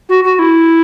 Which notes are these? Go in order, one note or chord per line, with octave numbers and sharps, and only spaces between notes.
F#4
F#4
E4